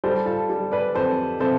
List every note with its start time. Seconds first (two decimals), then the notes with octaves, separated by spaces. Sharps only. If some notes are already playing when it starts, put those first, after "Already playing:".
0.04 G3 A4 C5
0.26 F4 A4
0.49 G3
0.71 B4 D5
0.94 F2 A4 C5
1.40 C3 A4 C5